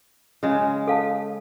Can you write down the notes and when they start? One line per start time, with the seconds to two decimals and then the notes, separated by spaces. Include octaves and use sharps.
0.43 C#3 G#3
0.88 A4 F5 A5